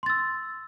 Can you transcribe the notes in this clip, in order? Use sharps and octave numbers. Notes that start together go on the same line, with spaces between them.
C6 E6 A6